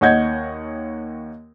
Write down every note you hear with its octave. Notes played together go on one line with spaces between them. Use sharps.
D#2 C#5 D#5 F#5 G6 G#6